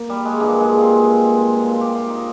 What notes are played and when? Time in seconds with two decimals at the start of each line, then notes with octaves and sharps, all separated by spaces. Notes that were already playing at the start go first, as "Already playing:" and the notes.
Already playing: A#3
0.10 G3
0.25 G#3
0.40 G2 F3 A#3
0.60 G#3
0.81 C4
1.62 A#2 F3
1.81 G4
1.95 F4
2.10 D#4